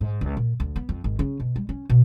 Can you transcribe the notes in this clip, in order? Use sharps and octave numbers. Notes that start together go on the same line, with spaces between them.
G#2
C#2
A#2
D2
B3
F2
G#1
C#3
B2
G3
C#4
B2